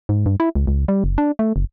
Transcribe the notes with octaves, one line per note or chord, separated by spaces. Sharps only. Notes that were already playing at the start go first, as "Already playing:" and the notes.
G#2
G2
E4
C#2
C#2
G3
F#1
D4
A3
F#1